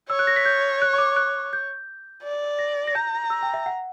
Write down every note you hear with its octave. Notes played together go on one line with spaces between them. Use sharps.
C#5 E6
F#6
A#6
B6
G6
F#6
C#6
D6
F#6
G6
D5
A#6
A#6
A#5 G6
E6
G5
E5
F#5